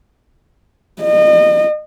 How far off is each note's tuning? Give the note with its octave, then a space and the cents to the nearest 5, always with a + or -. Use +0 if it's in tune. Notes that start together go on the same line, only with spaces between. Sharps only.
D#5 -30